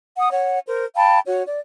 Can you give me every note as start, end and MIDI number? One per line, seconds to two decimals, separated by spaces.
0.18 0.31 78
0.18 0.31 87
0.32 0.59 73
0.32 0.59 78
0.67 0.86 70
0.67 0.86 72
0.96 1.19 77
0.96 1.19 79
0.96 1.19 81
0.96 1.19 83
1.26 1.44 66
1.26 1.44 73
1.46 1.59 74